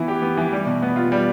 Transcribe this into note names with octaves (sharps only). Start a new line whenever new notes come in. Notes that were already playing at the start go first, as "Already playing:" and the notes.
Already playing: E3 B3 E4
G4
B3
E3
G3
B2
B3
F4
G3